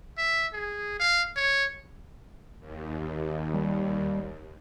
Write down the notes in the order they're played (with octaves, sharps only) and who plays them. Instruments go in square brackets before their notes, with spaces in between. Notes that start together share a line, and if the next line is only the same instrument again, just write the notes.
[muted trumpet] E5
G#4
F5
C#5
[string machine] D#2
[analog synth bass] G3